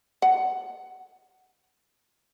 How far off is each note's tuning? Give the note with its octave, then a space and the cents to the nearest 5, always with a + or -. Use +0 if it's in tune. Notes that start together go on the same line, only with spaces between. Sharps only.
F#5 +20